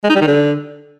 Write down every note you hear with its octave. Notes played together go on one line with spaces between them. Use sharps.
G#3
D#4
G3
D#3
D3